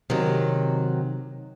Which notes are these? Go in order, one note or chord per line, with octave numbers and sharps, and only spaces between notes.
C3 D#3 F#3